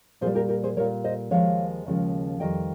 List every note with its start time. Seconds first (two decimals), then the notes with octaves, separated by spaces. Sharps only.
0.21 A#2 G#4 C5
0.26 G3
0.35 G4 A#4
0.49 G4 A#4
0.63 G#4 C5
0.77 A#2 G3 A#4 C#5
1.04 C5 D#5
1.31 D#2 C#3 F3 G#3 C#5 F5
1.86 D#2 C#3 F3 G#3
2.40 F2 D#3 G3 D#5 G5